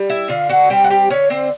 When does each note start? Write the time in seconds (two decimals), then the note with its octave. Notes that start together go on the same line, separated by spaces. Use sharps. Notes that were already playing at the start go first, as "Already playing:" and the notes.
Already playing: G3
0.10 E4 E5
0.29 D3 F4 F5
0.50 F#4 F#5
0.70 G3 C4 G4 G5
0.84 F#5
0.90 G4 G5
1.10 D3 C#4 C#5
1.30 C4 C5